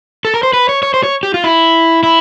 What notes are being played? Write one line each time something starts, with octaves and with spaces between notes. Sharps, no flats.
A4
A#4
C5
B4
C#5
C#5
C5
C#5
G4
F4
E4
E4